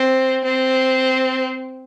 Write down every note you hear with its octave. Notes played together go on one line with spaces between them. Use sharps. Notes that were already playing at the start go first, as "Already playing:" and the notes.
Already playing: C4
C4